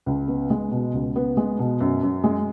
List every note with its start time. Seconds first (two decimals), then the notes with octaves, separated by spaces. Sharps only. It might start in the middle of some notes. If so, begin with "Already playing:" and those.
0.06 C#2
0.28 B3
0.50 G#3
0.71 B2
0.94 C#2
1.16 B3
1.37 G#3
1.59 B2
1.80 F#2
2.03 F#2
2.24 G#3